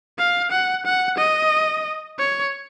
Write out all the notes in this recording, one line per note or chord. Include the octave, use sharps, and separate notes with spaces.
F5
F#5
F#5
D#5
C#5